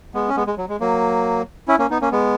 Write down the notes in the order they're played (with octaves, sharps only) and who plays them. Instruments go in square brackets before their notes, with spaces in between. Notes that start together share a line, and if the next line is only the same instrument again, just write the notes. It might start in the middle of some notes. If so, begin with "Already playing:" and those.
[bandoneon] G#3 B3
C#4
G#3 B3
G#3
F#3
G#3
F#3 A#3
C#4 E4
A#3 C#4
B3 D#4
A#3 C#4
G#3 B3